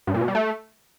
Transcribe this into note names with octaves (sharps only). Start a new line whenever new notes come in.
G2
A#2
B2
G3
A3